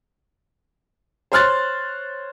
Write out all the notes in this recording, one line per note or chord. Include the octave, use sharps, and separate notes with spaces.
C5 C#5 C6 F6 F#6 A6